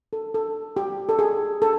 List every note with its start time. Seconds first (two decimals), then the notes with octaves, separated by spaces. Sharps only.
0.13 A4
0.34 A4
0.76 G4
1.09 A4
1.19 G#4
1.62 A4